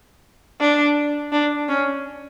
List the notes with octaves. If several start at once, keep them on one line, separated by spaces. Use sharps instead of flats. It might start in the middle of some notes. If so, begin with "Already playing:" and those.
D4
D4
C#4